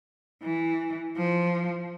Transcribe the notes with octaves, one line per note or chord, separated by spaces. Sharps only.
E3
F3